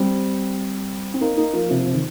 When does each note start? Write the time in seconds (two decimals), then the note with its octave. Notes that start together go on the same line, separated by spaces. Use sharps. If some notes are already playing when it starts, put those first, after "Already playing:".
Already playing: G3 C4
1.14 C4
1.21 A#3 D#4
1.37 A#3 D#4
1.53 F3 A#3
1.70 C3 F3
1.86 C3
1.94 D#3